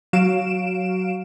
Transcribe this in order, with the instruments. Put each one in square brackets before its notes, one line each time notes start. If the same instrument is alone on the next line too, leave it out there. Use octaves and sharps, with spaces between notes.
[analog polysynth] F#3 F#4 F5 D7 E7